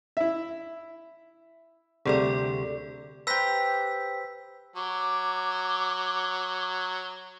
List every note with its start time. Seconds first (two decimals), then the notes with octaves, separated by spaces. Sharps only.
0.17 E4 E5
2.05 D2 C3 G3 G#4 A4 D5
3.27 G4 B4 C5 A#5 E6 B6
4.76 F#3 D6